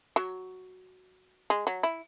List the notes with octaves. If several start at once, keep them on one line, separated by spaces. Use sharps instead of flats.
F#3
G#3
F#3
E4